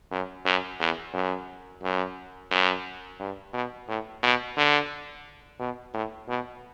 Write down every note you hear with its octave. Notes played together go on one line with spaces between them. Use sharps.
F#2
F#2
E2
F#2
F#2
F#2
G2
B2
A2
B2
D3
B2
A2
B2